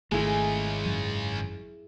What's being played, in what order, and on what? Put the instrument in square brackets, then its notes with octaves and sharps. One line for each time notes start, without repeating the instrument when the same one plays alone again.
[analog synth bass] G#1 [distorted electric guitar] C#3 G#3 [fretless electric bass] A3 [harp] E4 G#4
[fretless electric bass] F#2 F#3 C#4